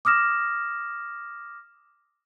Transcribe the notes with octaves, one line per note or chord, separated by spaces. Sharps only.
D6 D#6 F6 A#6 E7